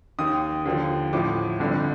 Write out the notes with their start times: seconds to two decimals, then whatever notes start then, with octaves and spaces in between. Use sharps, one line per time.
0.19 D#2 D#3 D#6
0.65 D#2 D3 F3
1.13 A1 A2 F3 D6
1.59 G1 F2 D3